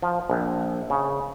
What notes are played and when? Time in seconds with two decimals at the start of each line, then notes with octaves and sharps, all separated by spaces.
0.02 F3
0.30 A#1
0.90 C#3